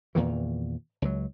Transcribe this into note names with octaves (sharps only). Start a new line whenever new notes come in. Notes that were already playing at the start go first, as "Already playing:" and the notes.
E2 A#2 D#3 E3
C#2 F#3